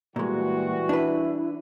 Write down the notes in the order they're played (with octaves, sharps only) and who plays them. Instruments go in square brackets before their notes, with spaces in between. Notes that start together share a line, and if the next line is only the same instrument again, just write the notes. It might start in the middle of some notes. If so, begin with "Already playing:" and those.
[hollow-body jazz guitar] A#2 G#3 [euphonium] E3 [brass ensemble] G3 F#4
[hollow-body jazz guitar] D4 B4 [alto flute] E4